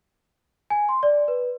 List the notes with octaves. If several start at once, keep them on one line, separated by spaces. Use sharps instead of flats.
G#5
C6
D5
B4